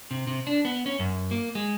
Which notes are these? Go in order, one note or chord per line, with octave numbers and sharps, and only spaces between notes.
C3
C3
D4
B3
C#4
F#2
A#3
G#3